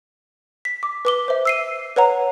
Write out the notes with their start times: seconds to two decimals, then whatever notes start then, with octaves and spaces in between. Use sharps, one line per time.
0.65 B6
0.83 D6
1.05 B4 D6 G7
1.28 C5 E5
1.45 E6 C7 D#7
1.96 B4 C#5 F#5 A#5